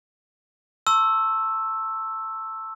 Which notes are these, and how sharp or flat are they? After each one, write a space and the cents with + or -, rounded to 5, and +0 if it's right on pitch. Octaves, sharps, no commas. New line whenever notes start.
A5 +20 C#6 -45 E6 +0